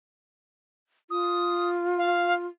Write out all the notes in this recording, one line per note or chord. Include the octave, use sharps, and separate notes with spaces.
F4 D#6
F5